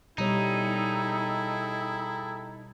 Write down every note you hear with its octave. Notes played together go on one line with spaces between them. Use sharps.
B2 G3 D#4 E4 G#4 A4 C#5 G5